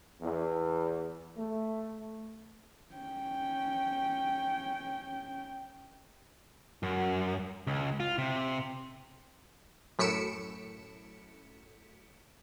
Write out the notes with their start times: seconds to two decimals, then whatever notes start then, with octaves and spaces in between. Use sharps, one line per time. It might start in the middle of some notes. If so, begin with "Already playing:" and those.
0.21 E2
1.37 A3
2.95 C#4 G5
6.83 F#2
7.67 C#2
8.00 F4
8.18 C3
9.99 F#2 A2 B6 C#7 D7 E7